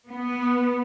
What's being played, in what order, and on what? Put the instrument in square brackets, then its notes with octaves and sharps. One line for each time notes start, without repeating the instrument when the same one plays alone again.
[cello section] B3